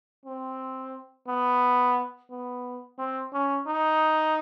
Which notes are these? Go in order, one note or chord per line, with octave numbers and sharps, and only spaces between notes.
C4
B3
B3
C4
C#4
D#4